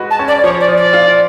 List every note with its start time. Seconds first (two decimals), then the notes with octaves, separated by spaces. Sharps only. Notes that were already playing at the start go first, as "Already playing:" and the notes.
Already playing: G#3 F#4 B4
0.10 A5
0.19 C#4
0.27 D5
0.43 F3 C#5
0.60 D5
0.68 F3
0.76 D5
0.93 F4